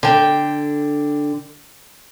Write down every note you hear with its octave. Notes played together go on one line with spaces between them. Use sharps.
D3 G5